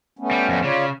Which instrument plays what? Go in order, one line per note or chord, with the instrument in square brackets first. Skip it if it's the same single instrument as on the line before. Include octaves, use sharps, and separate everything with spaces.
[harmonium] A3 B3 C#4
[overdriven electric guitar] G3
F2 G3
[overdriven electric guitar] C#3 [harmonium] F4 C#5 D5